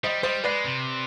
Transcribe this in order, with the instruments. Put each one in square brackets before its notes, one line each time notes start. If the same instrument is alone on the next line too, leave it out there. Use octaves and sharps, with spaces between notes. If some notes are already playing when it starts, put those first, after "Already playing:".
[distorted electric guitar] G3 [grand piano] C5 D#5
[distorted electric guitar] G3 [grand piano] C5 D#5
[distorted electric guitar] G#3 [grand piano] B4 D5
[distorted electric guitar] C3